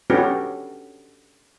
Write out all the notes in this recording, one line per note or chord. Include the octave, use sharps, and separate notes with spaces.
C#4 D4 F#4 G4 A4 B4